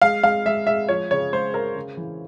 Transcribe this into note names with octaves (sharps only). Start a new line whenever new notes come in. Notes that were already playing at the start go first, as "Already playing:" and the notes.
G#3 F5
G#3 F5
G#3 E5
G#3 E5
F3 C#5
C#3 C#5
G#3 C5
C#3 A#4
C#3
E3